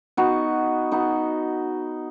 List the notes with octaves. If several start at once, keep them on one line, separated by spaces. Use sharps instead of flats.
B3 D#4 F#4
B3 D#4 F#4